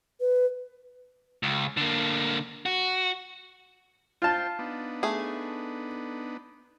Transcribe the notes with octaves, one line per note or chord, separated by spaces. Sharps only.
B4
C#2
D3 A#3
F#4
F4 C5 G5 A5
B3 D4 D#4
A3 G#4